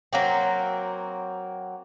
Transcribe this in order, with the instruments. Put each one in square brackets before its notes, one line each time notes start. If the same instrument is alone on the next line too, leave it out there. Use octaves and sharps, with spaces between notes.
[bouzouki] F#3 A#3 C4